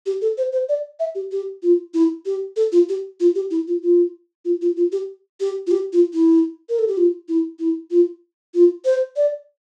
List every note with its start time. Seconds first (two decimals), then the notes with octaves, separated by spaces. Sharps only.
0.06 G4
0.22 A4
0.38 C5
0.52 C5
0.69 D5
1.00 E5
1.15 G4
1.32 G4
1.63 F4
1.94 E4
2.26 G4
2.56 A4
2.72 F4
2.89 G4
3.20 F4
3.35 G4
3.51 E4
3.68 F4
3.82 F4
4.45 F4
4.62 F4
4.76 F4
4.92 G4
5.40 G4
5.67 F4
5.71 G4
5.93 F4
6.14 E4
6.69 A#4
6.79 A4
6.88 G4
6.97 F4
7.29 E4
7.59 E4
7.91 F4
8.54 F4
8.85 C5
9.16 D5